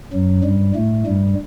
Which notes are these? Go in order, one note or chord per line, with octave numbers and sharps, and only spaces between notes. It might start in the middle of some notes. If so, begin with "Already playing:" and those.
F#2 F#3
G2 G3
A2 A3
G2 G3